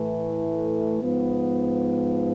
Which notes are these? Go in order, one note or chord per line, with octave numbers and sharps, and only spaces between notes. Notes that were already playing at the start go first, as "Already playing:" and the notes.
Already playing: A2 E3 A3
G#2 F3 B3